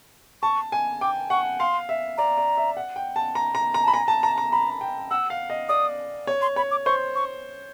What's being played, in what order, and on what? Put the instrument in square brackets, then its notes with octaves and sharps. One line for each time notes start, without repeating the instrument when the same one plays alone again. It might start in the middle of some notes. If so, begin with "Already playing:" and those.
[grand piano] A5 [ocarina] C#6
[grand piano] G#5
[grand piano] G5 [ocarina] D6
[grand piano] F#5 [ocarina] C#6
[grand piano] F5 [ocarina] C6
[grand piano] E5
[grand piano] D5 [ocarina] A#5
[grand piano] D5
E5
F#5
G5
A5
A#5
A#5
A#5
[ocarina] A5 [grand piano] B5
[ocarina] G#5 [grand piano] A#5
[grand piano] A5
[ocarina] A5 [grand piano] A#5
[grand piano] A#5
[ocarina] A#5 [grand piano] B5
[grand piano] G5
[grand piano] F#5 [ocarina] E6
[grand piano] F5
D#5
[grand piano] D5 [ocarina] D#6
[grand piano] C#5
[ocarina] C6
[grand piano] C#5 [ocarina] B5
[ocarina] D6
[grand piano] C5 [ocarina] C#6
[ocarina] C#6